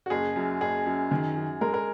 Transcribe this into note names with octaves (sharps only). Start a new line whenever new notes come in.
F#4
F#1 G#4
F#2
F#1 G#4
F#2
D#3
F#2
G#3 A#4
A#4